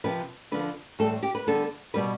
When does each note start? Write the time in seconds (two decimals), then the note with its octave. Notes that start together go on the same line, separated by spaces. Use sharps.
0.04 C3 F3 C4 B4
0.52 D3 F3 C4 B4
0.99 A2 E3 G3 C4 A4
1.23 G4
1.35 B4
1.47 D3 G3 B3 A4
1.94 B2 G3 C4 B4